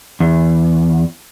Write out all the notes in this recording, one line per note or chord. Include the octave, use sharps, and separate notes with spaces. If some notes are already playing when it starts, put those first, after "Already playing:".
E2